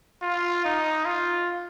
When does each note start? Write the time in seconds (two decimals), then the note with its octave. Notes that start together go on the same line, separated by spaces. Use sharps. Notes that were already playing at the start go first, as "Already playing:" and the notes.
0.22 F4
0.65 D#4
1.05 F4